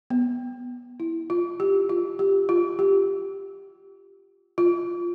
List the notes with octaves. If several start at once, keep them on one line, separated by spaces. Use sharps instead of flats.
B3
E4
F4
G4
F4
G4
F4
G4
F4